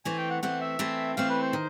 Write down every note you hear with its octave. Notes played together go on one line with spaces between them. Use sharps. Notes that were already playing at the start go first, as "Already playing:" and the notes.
E3 A3 C4 G#5
G5
F#5
E3 A3 C4 F#5
E5
E3 A3 C4
E3 A3 C4 F5
B4
C5
D#3